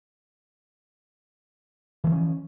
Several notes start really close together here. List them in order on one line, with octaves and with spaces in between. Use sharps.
E3 A3 F3 C#4